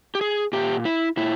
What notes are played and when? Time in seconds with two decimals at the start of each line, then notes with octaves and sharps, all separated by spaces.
0.15 G4
0.21 G#4
0.53 A#2 G4
0.85 E4
1.17 A#2 E4